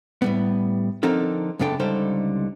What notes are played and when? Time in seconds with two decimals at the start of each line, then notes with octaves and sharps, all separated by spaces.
0.22 A2 G3 B3
1.03 D3 F3 C4 D#4 A4 A#4
1.59 F#2 C#3 B3 D4 A4 G5
1.80 C#2 D3 G3 D#4 A4 C5